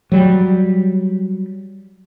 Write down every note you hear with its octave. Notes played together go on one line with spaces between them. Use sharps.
F#3 G3